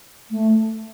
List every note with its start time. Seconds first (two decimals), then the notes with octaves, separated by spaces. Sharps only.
0.31 A3